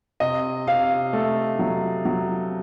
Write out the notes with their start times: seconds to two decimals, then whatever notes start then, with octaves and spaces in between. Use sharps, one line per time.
0.20 C3 D#5
0.67 C3 F5
1.13 A3
1.59 F#3
2.05 F#3